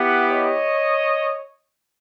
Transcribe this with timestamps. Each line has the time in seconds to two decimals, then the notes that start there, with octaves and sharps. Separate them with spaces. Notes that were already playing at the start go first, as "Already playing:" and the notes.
Already playing: B3 E4 G4 F#5
0.31 C#5 D#5